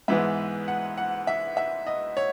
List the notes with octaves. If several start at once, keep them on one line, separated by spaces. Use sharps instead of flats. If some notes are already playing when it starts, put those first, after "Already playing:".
G#2 E3 G#3 B3 E5
F#5
F#5
E5
E5
D#5
C#5